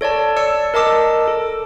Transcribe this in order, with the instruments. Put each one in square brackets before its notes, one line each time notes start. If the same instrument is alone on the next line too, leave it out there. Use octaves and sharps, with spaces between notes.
[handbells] A4 C#5 D5 A5
D5 E6 C#7
A#4 D#5 A5 D6 E6
A4